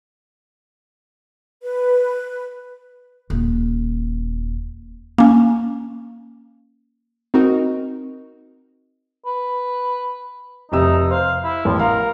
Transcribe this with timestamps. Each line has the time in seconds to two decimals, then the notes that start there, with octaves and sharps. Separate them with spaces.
1.62 B4
3.30 D#1
5.18 A#3 C#4
7.34 C4 D#4 F#4 A#4 D#5
9.26 B4
10.72 F1 C3 D#4 E6
11.11 C5 F5
11.44 E4
11.65 A1 F3
11.79 A#4 F5